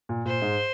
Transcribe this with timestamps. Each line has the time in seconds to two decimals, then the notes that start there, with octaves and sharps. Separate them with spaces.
0.09 A#2
0.25 A#2 C5
0.42 G#2